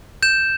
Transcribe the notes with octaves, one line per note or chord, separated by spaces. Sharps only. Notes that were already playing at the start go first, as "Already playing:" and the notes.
G6 E7